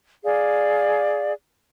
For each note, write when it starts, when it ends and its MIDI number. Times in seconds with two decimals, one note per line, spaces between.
0.23 1.31 68
0.23 1.31 74
0.23 1.31 77